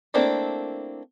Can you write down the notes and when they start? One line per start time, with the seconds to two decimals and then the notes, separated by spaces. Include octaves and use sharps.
0.14 A3 A#3 C4 D4 E4